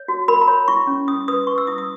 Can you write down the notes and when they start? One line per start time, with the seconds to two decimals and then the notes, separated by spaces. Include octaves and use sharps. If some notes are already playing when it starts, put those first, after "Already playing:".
Already playing: C#5
0.08 F#4
0.28 A#4 B5
0.42 A#5
0.48 C#5 B5
0.68 E4 C#6
0.87 C#4
1.08 C#4 D#6
1.28 B4 D#6
1.47 B4 C#6
1.58 E6
1.67 E4 D#6
1.78 D#6